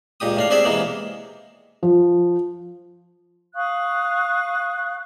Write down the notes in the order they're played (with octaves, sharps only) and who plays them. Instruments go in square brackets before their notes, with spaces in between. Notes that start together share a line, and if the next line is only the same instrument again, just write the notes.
[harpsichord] C#2 A#2 G4 D#6
A2 D4 F5
C4 D4 G4 G#4 D5 E5
C3 E3 G#3 A#3 B3
[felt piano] F3
[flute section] F5 C#6 D#6 F#6